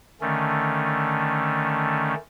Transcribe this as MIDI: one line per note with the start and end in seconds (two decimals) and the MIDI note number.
0.21 2.14 50
0.21 2.14 51
0.21 2.14 57
0.21 2.14 61